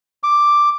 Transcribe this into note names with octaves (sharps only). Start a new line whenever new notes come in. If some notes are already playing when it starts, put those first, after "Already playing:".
D6